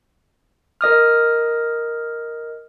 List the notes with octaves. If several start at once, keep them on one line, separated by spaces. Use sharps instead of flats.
A#4 D#5 D#6 F6